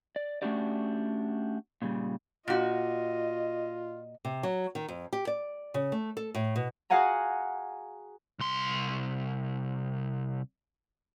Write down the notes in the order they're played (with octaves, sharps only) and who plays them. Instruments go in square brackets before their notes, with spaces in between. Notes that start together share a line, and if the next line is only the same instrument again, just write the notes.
[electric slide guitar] D5
A3 C#4 D4 F#4 G4 D5
A#2 C#3 G3
[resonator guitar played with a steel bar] A#2 F#4 [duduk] F4 [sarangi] D#5
[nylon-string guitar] C3
F#3
D#3
F2
G4
D5
C#3
A3
A4
A2
B2
[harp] F#4 G#4 F5 F#5 G#5 A#5
[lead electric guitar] C2 C6